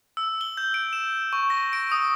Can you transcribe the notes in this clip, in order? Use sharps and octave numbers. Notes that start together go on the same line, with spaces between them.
E6
G7
G6
D7
E7
C#6
A#6
D7
D#6